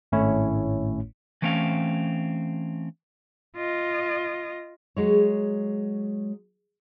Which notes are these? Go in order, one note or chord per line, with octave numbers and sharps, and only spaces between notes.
G#1 A2 A3 C#4 E4 C#5
E3 A3 C4 C#4 F5
F4 D#5
F#3 G#3 C#5